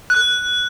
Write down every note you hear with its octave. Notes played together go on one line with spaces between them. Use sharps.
F#6